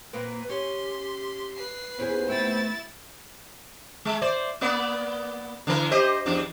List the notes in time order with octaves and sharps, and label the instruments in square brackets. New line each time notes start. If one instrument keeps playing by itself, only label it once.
[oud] A#2 A#3 C4 [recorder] B4
[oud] C#4 [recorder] G4 [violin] C6
[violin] B4 C7
[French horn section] D#2 B3 [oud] C#4 E4 G#4 [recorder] C5
[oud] A3 C4 D#4 [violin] E4 A6
[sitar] G#3
C5 D5
A#3 B3 D5
D3 E3 A#4
G4 C5 D#5
E2 F3 D4